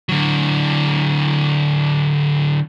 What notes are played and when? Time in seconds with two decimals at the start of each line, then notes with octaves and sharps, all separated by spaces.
0.09 D3 F#3